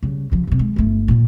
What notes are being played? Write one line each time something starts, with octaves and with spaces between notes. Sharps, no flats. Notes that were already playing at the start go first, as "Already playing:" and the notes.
C#3 G3
C#3 F3
F#2 C3
G#3
G1 A3
A#2 D#3